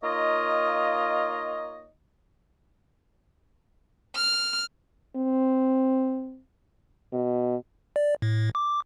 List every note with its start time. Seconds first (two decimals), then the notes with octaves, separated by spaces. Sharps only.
0.03 A#3 D#4 F4 C#5 D#5
4.15 F6
5.16 C4
7.13 B2
7.96 D5
8.22 A2
8.55 D6